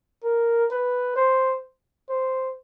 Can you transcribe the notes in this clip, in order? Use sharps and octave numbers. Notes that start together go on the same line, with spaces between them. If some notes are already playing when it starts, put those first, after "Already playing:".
A#4
B4
C5
C5